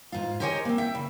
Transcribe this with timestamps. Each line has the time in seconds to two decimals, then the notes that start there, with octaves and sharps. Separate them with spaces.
0.12 G#2 F4
0.40 G4 A#4 C5 C#5 D#5 G#5
0.65 A#3 C4
0.78 E5 G5
0.95 C#3